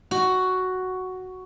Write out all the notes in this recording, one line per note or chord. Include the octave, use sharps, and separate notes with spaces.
F#4